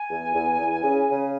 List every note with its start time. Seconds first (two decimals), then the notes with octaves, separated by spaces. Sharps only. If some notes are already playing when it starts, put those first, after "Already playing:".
Already playing: G#5
0.10 E2
0.34 E2
0.59 E2
0.84 C#3
1.08 C#3